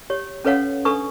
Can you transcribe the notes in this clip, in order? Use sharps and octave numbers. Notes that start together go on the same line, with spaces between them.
G4 C#5
C#4 A4 B4 C#5 F5 F#5
D4 A4 B4 C#6 D#6